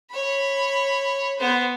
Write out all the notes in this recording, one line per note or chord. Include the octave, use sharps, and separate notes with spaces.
C#5 B5
B3 C5